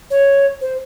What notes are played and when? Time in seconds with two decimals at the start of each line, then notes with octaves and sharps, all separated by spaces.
0.11 C#5
0.61 C5